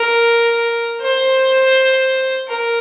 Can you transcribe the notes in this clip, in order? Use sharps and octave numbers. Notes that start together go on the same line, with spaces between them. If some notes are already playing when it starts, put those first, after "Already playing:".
Already playing: A#4
C5
A#4